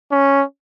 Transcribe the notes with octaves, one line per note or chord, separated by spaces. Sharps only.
C#4